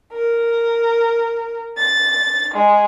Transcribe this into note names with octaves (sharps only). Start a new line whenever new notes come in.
A#4
A6
G#3